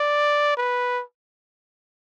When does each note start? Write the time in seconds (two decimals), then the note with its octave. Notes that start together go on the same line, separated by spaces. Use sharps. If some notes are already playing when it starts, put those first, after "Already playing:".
Already playing: D5
0.57 B4